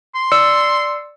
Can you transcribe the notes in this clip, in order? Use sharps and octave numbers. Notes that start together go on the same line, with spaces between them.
C6
D5 E6 C#7